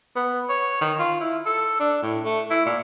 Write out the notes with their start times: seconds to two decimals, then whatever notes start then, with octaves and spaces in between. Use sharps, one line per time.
0.16 B3
0.49 C#5
0.81 D#3
0.99 F4
1.20 E4
1.46 A4
1.80 D4
2.02 A2
2.25 A3
2.50 E4
2.66 A#2